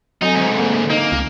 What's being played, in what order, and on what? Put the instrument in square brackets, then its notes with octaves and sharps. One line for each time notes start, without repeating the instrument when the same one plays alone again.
[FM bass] F#3 [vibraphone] C4 A4 G#5 [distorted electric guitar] D#4
[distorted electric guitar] D2 G#2
[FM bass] A#3
[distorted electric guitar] A#3 [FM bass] D#4
[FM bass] C#2